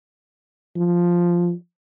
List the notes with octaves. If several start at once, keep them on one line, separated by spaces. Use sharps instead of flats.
F3